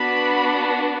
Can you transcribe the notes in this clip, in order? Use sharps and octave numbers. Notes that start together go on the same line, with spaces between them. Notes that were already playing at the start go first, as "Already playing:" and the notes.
Already playing: B3 D4 F#4 B5